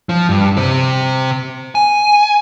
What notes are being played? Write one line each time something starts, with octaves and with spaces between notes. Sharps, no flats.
F3
G2
C3 C4
G#5